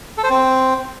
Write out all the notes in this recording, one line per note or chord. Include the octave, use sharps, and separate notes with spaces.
A4
C5
C4